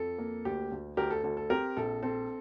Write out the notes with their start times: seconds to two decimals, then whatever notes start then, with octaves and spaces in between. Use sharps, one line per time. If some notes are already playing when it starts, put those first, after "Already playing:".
Already playing: F2 A4
0.18 A#3
0.45 D2 G4
0.71 D2
0.97 D2 G4 A#4
1.11 A4
1.24 D2 A4
1.37 A4
1.50 C4 G4 A#4
1.77 A#1 A4
2.03 C4 A4